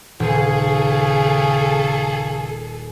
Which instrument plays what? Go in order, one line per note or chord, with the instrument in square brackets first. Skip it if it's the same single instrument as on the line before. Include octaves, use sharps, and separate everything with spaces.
[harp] D#1 [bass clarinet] C#3 [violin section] G#4 A4